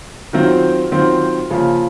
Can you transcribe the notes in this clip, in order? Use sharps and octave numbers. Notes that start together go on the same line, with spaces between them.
D#3 F#3 C4 F4 C5
D#3 F#3 C4 F4 C5
C#3 F3 A#3 F4